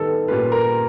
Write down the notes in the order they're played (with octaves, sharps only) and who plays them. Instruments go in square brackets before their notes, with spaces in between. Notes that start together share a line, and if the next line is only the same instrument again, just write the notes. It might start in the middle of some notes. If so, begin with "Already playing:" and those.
Already playing: [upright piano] D#3 G3 B3 [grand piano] A4
[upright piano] A#2 G3 A#3 C#4 F4 [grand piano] B4
[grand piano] A#4